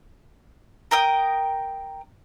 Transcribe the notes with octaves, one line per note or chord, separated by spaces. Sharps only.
A#4 G5 D#6